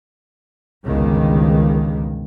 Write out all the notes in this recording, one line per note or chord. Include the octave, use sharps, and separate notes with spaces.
G1 C#2 B2 D#3